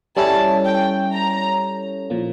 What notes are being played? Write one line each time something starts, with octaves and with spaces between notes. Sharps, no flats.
G3 C#4 E4 A4 C#5 A5
G5
A#5
A#2 F3 A#3